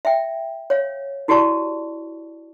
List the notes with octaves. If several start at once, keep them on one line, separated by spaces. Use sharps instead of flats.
E5 G5
C#5 F5
E4 F#4 G4 D5 A5 C#6